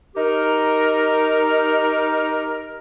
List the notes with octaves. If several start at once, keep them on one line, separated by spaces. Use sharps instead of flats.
D#4 G4 A#4